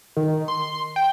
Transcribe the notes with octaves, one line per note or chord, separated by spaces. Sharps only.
D#3
C6
G5